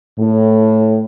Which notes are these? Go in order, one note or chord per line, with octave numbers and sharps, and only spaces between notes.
A2